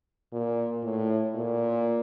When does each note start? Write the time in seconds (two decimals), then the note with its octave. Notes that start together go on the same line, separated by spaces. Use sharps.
0.33 A#2
0.83 A2
1.35 A#2